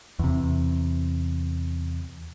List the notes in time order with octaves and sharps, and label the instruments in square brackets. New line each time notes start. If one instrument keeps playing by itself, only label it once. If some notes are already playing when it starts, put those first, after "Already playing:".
[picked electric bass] E2 C3